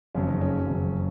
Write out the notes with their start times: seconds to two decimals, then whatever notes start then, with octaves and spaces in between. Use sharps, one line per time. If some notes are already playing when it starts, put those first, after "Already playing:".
0.15 F#1 F2 C#3 F#3 C#4
0.28 D#4
0.41 C#4
0.67 F#1 F2 C#3 F#3